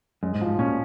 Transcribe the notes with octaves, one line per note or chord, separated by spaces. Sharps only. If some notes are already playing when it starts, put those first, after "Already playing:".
F#2 G#3
G#2
F3
G#2
A#2 C#4